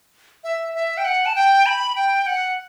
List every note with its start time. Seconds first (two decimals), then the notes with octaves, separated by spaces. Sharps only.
0.44 E5
0.75 E5
0.97 G5
1.05 F#5
1.26 A5
1.35 G5
1.66 B5
1.96 G5
2.26 F#5